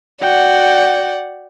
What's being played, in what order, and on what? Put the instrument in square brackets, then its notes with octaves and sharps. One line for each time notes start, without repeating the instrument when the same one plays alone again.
[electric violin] F#4 G5 [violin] D5 F#5